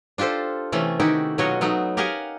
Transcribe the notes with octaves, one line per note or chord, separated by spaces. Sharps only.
D4 F4 G4 A4 C5
C3 E3 A3 C#4 A4
D#3 D#4 E4 F#4 G4
B2 F#3 F4 F#4 C#5 D#5
F#3 A3 B3 D#4
G4 A#4 D#5 F5 F#5 G#5